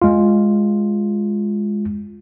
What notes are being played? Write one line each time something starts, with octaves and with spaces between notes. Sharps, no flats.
G#3 F4